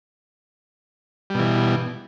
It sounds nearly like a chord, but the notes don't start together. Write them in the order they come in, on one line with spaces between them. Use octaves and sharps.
G3 B2 E3